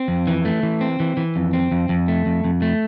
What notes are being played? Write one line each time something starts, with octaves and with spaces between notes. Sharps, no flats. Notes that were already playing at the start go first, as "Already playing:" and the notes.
Already playing: C4
F2
E3
A3
E3
C4
E3
E3
F2
C4
F2
F2
A3
F2
F2
A3